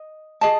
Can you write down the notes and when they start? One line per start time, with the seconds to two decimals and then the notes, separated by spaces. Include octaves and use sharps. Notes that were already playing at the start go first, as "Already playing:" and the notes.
Already playing: D#5
0.41 G#4 D#5 A5